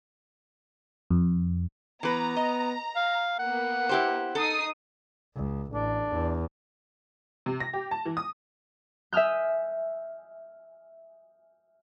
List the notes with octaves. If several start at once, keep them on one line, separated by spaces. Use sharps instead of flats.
F2
E3 B3 B4 A#5
D#5
F5
A#3 B3 F#5
E4 G4 C5
D#4 A4 D#6 C7
C#2
A1 D4
E2
C3
A#6
G4
A5
E3
D#6
E5 G#5 D#6 F6 G6